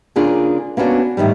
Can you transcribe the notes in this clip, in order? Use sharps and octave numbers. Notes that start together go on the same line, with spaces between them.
C#3 A#3 D4 F4 G#4
A#3 B3 C#4 D4 F#4
A2 D#3 E3 G3